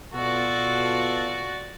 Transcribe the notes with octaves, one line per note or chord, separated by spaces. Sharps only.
B2 F4 F#4 A4 D5